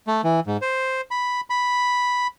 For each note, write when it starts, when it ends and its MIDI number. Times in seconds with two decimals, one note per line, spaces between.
0.07 0.21 57
0.24 0.40 52
0.47 0.57 44
0.62 1.01 72
1.11 1.41 83
1.50 2.27 83